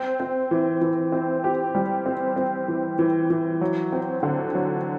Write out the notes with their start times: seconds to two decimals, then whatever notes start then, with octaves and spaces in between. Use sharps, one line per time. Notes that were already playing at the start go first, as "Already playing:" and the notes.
Already playing: C4
0.20 C4
0.51 E3
0.81 E3
1.12 C4
1.44 G4
1.75 G3
2.06 C4
2.36 C4
2.68 E3
2.99 E3
3.30 E3
3.61 F#3
3.92 C4
4.23 D3
4.55 F#3